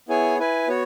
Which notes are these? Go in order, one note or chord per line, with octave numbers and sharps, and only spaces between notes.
B3 E4 G#4 C#5 G#5
E4 B4 G#5
B3 F#4 C#5